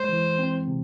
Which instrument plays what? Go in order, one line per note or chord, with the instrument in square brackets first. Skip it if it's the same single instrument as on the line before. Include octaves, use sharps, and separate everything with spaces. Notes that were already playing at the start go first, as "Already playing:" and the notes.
Already playing: [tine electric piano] G#3 [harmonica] C5
[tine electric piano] E3
C4
C3